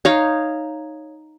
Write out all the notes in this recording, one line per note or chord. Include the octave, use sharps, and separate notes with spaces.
D#4 C#5 F5